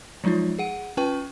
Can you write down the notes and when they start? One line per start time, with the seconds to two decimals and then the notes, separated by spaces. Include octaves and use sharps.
0.24 F3 F#3 G#3 D#4 F4
0.59 G#4 F#5 D#7
0.97 C#4 F4 B4 G5 C#6